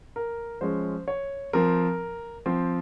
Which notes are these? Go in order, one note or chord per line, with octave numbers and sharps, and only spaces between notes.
A#4
F3 G#3 C#4 C5
C#5
F3 C4 A#4
F3 C4